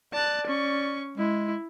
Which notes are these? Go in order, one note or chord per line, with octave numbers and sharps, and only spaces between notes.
D5 A5 F#6
C#4 C#6
G#3 E4